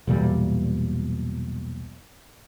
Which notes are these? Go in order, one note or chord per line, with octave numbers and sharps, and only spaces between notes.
B1 E2 A#2 G3